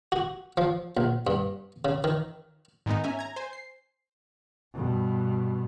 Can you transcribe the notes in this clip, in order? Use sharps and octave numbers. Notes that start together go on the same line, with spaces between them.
F#4
F3
A#1
G2
C#3
D#3
G#2 D#3 G#3 B3 D#4
C#4 E5 G#5 A#5
A#5 G#6
C5 G#5
C7
G2 B2